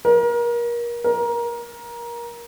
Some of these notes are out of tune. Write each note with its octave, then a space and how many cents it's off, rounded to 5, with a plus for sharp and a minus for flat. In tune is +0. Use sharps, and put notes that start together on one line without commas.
A#4 +30
A#4 +20